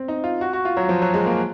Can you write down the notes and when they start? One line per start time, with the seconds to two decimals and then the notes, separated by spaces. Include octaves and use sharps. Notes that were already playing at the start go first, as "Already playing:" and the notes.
Already playing: C4
0.08 D#4
0.24 F4
0.41 F#4
0.53 F#4
0.65 F4
0.77 F#3
0.89 F3
1.02 F#3
1.14 G#3
1.26 A#3